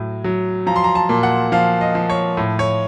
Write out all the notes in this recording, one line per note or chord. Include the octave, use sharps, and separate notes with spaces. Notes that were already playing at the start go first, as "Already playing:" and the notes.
Already playing: A2 F#3
F#3
F3 A#5
C6
A#5
A5
A#2
F#5
F3 F5
D#5
F3
C#5
A2
C#5